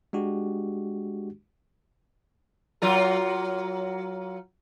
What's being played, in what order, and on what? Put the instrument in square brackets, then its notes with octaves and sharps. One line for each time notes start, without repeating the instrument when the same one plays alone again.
[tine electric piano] G#3 D4 F#4 G4
[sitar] F#3 F4 A#4